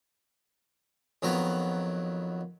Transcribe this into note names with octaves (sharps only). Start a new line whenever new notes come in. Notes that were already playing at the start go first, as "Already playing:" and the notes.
F2 D#3 F#3 B3 A#5